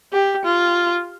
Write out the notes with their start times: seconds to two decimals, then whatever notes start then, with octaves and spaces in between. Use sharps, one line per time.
0.13 G4
0.45 F4